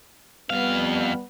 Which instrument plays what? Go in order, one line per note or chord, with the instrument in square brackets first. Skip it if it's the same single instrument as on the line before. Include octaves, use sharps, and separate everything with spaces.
[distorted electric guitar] F2 F5 [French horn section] G3 B3